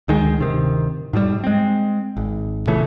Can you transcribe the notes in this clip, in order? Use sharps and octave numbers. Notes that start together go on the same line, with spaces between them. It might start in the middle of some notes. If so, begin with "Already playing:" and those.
D2 D#3 G#3
D1 C3 D#3
G#2 B2 D3 G3
G#3 C4
G#1
A#2 C#3 E3 A3